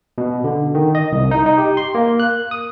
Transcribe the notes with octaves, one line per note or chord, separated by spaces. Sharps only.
B2
D3
D#3
D#5
C2
D#4
D#4
G4
C6
A#3
F#6
D#6